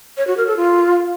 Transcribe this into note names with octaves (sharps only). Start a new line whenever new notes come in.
C#5
F#4
A#4
A4
F4